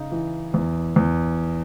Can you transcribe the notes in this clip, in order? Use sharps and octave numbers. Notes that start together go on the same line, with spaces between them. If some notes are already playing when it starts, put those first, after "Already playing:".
Already playing: C#3 D#4
E3
E2
E2